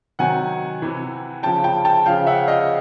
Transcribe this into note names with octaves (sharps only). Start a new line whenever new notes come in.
C3 D#3 F#3 F#5 G#5
C3 E3
C#3 F3 G5 A5
G5 A5
G5 A5
C#3 F3 F5 G5
E5 F#5
D#5 F5